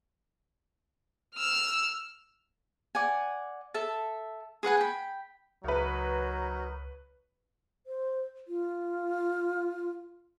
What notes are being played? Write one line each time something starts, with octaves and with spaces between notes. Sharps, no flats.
E6 F6
D5 F#5 G#5
A4 E5 A5
G#4 B4 F#5 G#5
G5 B5
C#2 F#3 D#4 A#4 B4 C#5
C5
F4